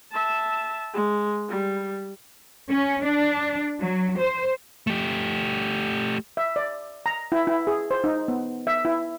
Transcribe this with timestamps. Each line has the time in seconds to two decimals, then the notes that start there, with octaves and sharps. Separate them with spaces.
0.12 E5 A5
0.94 G#3
1.49 G3
2.70 C#4
3.03 D4
3.81 F#3
4.18 C5
4.87 A3 G4
6.37 E5
6.56 D5
7.06 A#5
7.32 E4
7.47 E4
7.67 G#4
7.91 C5
8.04 D#4
8.28 B3
8.67 E5
8.85 E4